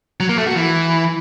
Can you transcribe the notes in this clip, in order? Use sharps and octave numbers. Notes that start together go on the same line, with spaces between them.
F#3
A#3
A3
F#4
E3